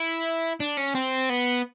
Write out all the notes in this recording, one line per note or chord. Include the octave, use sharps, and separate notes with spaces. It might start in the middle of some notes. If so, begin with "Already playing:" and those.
Already playing: E4
D4
C#4
C4
B3